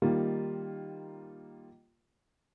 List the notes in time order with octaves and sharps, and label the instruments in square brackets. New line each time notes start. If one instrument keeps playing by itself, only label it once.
[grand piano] D#3 G3 A#3 D#4 F4